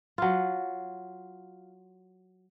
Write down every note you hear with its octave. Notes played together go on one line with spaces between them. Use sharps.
F#3 F4